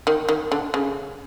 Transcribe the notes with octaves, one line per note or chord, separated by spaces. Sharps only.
D#3
D#3
D3
C#3